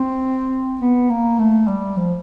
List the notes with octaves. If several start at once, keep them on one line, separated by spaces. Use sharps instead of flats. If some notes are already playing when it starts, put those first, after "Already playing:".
Already playing: C4
B3
A#3
A3
G3
F3